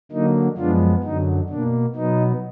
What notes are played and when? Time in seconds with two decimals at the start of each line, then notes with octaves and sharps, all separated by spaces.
0.12 D3 F#3 A#3 D#4
0.58 F#2 F3 G#3 B3 D4 F4
1.03 F#2 D3 F#3 D#4
1.49 B2 A#3 D4
1.95 B2 F#3 B3 D#4